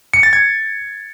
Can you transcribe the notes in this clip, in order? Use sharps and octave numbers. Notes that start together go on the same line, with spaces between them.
C#7
A6
G#6